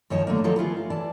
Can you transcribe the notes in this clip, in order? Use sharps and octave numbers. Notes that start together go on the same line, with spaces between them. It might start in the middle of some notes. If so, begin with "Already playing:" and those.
F#2 D#3 F3 C#5 A5
D3 F#3 A3 A#3
D#3 F3 F#3 A4 A#4 C#5
B3 E4 F4 G#4
F5
E3 D5 A5